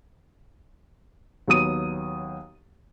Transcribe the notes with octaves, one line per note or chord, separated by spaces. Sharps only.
D#2 F#3 B3 D#6 D#7